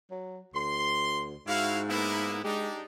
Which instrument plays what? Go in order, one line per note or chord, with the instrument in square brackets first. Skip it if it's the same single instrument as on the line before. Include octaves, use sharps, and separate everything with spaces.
[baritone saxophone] F#3
[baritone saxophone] D2 [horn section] C6
[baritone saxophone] G#2 [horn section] E4 F#4 F5
[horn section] A#3 B3 E4
[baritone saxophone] G#3 [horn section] D4 D#4 G4